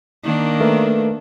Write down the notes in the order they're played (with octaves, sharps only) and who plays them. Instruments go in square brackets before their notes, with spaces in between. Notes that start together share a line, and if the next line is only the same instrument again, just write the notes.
[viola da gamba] D#3 A#3 D4
[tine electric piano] A3 A#4 B4